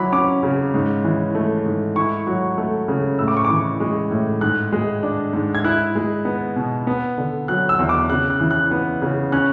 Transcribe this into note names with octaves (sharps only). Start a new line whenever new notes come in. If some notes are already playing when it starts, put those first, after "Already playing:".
Already playing: F#3 E4 B5 D6
C#4 D6
C#3
G#2
E3
A3
G#2
E4 C#6
F#3
A3
C#3
A2 E6
D6
C#6
D6
E3
G#3
A2
G#2 F#6
G#3
D4
G#2
G#6
E4 F#6
G#3
B3
B2
B3
D3
F#3 F#6
E6
E2
D6
C#3 F#6
F#6
E3
F#6
B3
C#3
C#4 F#6